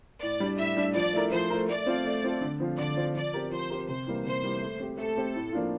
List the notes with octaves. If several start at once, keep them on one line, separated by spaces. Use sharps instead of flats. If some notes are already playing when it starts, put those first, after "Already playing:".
A2 D5
G3 D4
A2 E5
G3 D4
F3 D5
A3 E4 A#4
F3 C5
A3 E4 A#4
A3 D5
C4 F4 A4
A3
C4 F4 A4
D3
F3 C4 F4
D3 D5
F3 C4 F4
F3 D5
C4 G4 A#4
F3 C5
C4 G4 A#4
C3 C5
E3 G3 A#3
C3 C5
E3 G3 A#3
A3
C4 G4
A3 A4
C4 G4
A2
F3 A#3 D4 F4